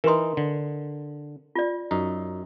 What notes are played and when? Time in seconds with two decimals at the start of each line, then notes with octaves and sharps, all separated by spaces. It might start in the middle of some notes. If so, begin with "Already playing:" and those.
0.04 E3 D#4 A#4 B4 C6
0.37 D3
1.55 F4 D5
1.91 F#2 D#4